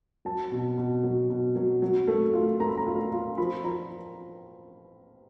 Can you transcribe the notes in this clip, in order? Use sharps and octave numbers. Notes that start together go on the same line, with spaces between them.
F#3 A5
B2
B2
F#3
B2
F#3
F#3
A3
F4
A3 A#5
B5
A#5
F4
F4
F3 B5
F3 A#5